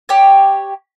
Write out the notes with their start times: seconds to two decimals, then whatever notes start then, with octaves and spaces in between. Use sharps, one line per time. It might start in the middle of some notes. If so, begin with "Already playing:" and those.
0.09 G4 C#5